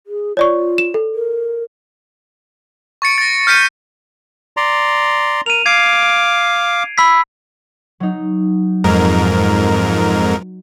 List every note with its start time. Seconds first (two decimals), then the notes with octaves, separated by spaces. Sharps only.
0.07 G#4
0.37 F4 C#5 D5 C#6
0.78 E7
0.94 A4
1.15 A#4
3.02 C#6 A6 C#7 D7
3.18 A6 A#6
3.47 F6 G6 B6 C#7 D#7
4.57 D5 A#5 C6
5.46 A#4 D#7 F7
5.66 F5 D6 G#6 C7 D7
6.98 B5 E6 B6
8.00 F#3 D#4
8.84 F2 G#2 A#4